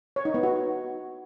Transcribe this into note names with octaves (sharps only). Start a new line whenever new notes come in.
C#5
D#4
B3
F#4